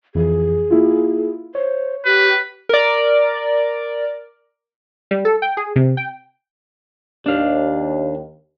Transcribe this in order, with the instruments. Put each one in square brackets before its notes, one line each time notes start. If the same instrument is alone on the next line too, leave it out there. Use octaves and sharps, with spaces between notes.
[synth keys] F2 E3 [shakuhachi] G#4
[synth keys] A#3 E4 F4
[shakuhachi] C5 [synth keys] C#5
[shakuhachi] G4 [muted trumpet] B4
[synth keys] A#4 D5
[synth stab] G3
A4
G5
G#4
C3
G5
[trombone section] D#2 [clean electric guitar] D4 F5